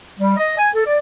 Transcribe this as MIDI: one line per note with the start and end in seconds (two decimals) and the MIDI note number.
0.19 0.36 55
0.37 0.57 75
0.58 0.69 80
0.74 0.86 69
0.86 0.97 74